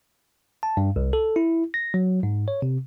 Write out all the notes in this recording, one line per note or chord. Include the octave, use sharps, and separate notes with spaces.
A5
G2
C2
A4
E4
A#6
F#3
G#2
C#5
C3